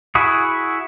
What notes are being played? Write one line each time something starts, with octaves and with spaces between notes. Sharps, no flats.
E4 F#4 G#4